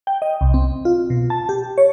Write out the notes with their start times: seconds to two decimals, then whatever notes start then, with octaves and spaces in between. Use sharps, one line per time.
0.07 G5
0.22 D#5
0.41 C2
0.54 C4
0.85 F4
1.10 B2
1.30 A5
1.49 G4
1.78 C#5